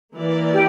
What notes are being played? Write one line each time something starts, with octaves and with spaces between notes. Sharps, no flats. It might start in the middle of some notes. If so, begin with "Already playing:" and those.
E3 A#3 E4 A#4 D5
G4